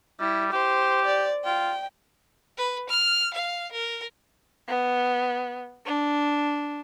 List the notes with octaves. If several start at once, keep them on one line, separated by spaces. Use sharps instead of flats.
G3 E4
G4 C5
D5
F4 G5
B4
F6
F5
A#4
B3
D4